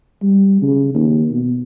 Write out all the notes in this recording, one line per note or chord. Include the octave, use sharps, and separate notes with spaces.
G3
C#3
D#2
B2